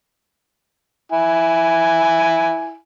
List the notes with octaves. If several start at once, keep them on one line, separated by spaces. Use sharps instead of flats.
E4 G#5